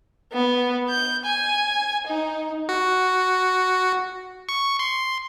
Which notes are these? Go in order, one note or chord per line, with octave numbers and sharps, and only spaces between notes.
B3
G6
G#5
D#4
F#4
C#6
C6